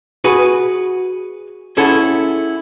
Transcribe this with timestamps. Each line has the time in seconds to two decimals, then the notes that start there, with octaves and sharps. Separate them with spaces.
0.24 F#4 G#4 B4
1.77 C#4 E4 G#4 A4 F#5